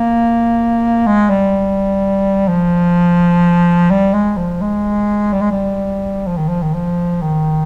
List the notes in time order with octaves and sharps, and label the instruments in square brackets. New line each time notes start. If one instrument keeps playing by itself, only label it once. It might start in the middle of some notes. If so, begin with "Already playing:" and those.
Already playing: [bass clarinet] A#3
G#3
G3
F3
G3
G#3
F3
G#3
G3
G#3
G3
F3
D#3
F3
D#3
F3
D#3